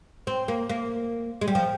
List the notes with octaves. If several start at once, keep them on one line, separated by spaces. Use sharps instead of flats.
C4
A#3
A#3
G#3
G3
F3